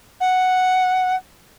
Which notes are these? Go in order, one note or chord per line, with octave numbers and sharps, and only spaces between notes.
F#5